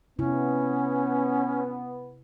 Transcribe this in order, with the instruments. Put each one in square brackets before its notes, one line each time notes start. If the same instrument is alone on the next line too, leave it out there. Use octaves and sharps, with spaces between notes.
[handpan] C3 E4 [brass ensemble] B3 [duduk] C#4